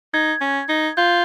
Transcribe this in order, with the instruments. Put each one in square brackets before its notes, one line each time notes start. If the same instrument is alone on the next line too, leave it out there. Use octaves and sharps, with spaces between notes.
[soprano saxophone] D#4 [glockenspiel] G#6
[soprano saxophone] C#4
D#4
[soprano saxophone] F4 [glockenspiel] G6